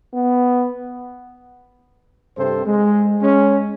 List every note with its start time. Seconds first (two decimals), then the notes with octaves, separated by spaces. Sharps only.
0.14 B3
2.38 G2 C3 A4 C5
2.66 G#3
3.21 G#3 C#4